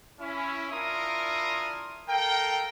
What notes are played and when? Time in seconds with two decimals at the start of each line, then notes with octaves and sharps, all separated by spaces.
0.20 C#4 E4
0.71 D4 E4 F4 A#4 C6 D#6
2.09 A4 A#4 F5 G5